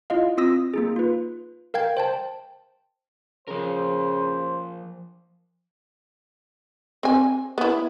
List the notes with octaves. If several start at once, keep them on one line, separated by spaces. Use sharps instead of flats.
E4 F4 D#5 F5
C4 F4 D#6 E6 A#6
A#3 D#4 G#4
F4 B4
A#4 F5 G5 G#6
C5 G5 A5
C#3 F3 A#4 C5
C4 G#5
B3 E4